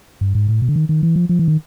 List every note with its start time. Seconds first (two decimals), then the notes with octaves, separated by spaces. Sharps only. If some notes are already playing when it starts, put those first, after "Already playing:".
0.21 G2
0.35 G#2
0.48 A2
0.62 B2
0.69 D3
0.76 D#3
0.89 D#3
1.03 E3
1.16 F3
1.29 F3
1.39 E3
1.48 D#3